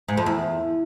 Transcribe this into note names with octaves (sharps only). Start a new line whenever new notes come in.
G#2
F2
E2